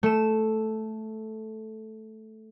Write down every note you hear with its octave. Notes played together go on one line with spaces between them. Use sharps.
A3 E7